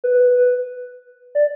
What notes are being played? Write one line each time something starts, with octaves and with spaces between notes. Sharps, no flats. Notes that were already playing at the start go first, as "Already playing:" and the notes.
B4
D5